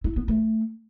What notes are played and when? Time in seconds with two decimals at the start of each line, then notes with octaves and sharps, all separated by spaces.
0.04 E4
0.16 B3
0.28 A3